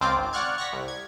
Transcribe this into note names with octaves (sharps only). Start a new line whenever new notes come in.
C#2 C4 F4 D6
G#1
D5 F#5 C#6 F6 F#6 G#6
C#6 A#6 B6
C2
G#6